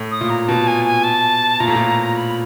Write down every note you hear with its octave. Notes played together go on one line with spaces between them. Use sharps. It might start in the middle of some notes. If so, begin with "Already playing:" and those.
Already playing: A2
D#6
A#2
A#5
B2 A5
G#5
G#5
A5
A#2 A#5
A2
A#2
B5